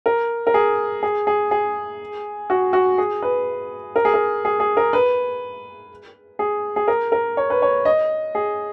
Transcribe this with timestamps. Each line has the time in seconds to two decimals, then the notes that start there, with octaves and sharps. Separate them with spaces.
0.06 A#4
0.47 A#4
0.54 G#4
1.03 G#4
1.27 G#4
1.51 G#4
2.50 F#4
2.73 F#4
2.98 G#4
3.22 B4
3.96 A#4
4.05 G#4
4.14 A#4
4.45 G#4
4.60 G#4
4.77 A#4
4.93 B4
6.39 G#4
6.76 G#4
6.88 A#4
7.12 A#4
7.37 C#5
7.50 B4
7.62 C#5
7.85 D#5
8.35 G#4